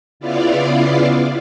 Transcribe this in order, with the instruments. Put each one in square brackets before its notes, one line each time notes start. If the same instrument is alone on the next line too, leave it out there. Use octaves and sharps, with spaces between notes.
[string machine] C#3 B3 E4 F4 D5 F5